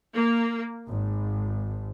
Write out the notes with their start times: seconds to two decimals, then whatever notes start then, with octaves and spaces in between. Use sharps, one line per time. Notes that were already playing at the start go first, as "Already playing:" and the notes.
0.14 A#3
0.87 G#1